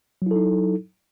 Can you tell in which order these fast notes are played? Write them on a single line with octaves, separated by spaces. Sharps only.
F#3 E4 A4 D#4